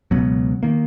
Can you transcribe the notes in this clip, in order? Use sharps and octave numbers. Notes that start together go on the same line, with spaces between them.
C#2 B2 F#3 B3
D#3 A#3